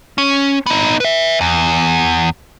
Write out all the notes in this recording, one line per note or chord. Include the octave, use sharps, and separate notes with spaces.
C#4
B3 D#4
B4 E5
E2